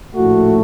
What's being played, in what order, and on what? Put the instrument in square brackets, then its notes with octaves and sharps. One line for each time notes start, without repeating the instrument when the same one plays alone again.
[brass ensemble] A#1 A2 A3 F#4